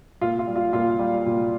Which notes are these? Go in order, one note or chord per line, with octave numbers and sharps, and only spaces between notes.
A#2 F4
F4
G3
F4
A#2 F4
G3
A#2